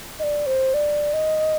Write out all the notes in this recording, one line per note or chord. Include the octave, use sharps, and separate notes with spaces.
D#5
D5
C5
D5
D#5